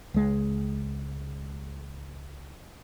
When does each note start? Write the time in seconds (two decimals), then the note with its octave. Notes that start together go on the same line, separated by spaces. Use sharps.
0.14 C#2 G#3